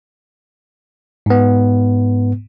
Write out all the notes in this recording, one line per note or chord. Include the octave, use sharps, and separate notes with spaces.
G#2 B3